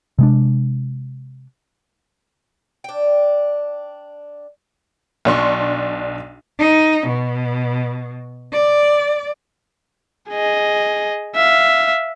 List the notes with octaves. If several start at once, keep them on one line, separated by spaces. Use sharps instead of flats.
C3 G#3 D4
D4 G5
B1 D4 C6 C#6
D#4
B2
D5
G#4 D#5
E5 F5